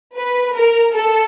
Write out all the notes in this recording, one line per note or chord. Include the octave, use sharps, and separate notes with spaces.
B4
A#4
A4